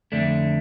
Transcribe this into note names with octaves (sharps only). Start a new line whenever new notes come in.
F2 D3 A3 D4